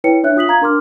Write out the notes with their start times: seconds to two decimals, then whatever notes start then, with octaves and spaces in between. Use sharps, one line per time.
0.04 E4 B4 C#5 G5 C#7
0.23 D4 C#5 E5 F#6
0.36 F4 D#6 B6 F#7
0.48 F5 A#5 G#6
0.61 D4 A#4 C6 D6 F6